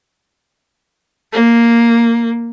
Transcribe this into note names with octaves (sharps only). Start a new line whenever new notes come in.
A#3